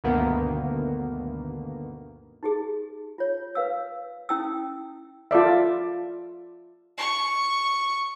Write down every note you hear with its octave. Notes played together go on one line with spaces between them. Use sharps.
D2 G2 B2 D#3 A#3 B3
D#4 G4 G#4
F4 C#5
B4 F5 E6
C#4 E4 G5 D#6 E6
F4 A4 D5 E5
C#6